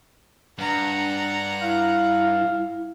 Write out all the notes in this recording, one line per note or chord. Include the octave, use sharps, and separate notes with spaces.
G2 D4 F#5 A#5
E4 F5